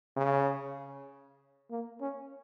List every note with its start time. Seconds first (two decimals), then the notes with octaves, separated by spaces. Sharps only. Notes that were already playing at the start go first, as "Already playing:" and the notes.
0.17 C#3
1.70 A#3
2.01 C#4